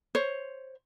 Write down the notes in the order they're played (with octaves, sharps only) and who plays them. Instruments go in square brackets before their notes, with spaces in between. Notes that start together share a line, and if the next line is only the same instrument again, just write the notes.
[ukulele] C5 C#5